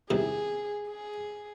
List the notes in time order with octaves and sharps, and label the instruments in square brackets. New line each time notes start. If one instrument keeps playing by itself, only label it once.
[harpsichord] E2 C3 D#3 [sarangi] G#4
[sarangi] G#4